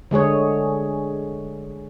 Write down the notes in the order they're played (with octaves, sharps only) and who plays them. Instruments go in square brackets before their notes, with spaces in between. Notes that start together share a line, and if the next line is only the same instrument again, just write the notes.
[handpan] D3 G#3 G#4 C#5